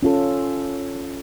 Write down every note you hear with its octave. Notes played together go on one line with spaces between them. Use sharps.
C#4 F4 A4